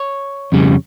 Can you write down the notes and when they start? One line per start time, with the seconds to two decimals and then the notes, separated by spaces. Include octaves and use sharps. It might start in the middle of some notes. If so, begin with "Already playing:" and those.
Already playing: C#5
0.52 F2 C#3 G3